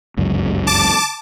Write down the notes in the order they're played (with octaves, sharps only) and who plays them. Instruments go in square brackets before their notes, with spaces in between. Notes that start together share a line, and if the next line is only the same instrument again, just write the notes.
[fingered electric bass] G1 C#2 F#2
[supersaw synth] A5 D6